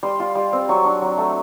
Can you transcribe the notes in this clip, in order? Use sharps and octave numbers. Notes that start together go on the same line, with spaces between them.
G3 C6
F4
G3
C4
F#3 C#6
D4
F#3
A3